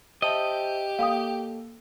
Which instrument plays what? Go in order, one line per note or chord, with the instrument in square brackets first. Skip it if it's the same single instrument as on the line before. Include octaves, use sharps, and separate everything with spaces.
[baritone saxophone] G4 [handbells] C5 E5 A5 [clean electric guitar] D#5
[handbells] A#3 A4 [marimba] F5 G5 D#6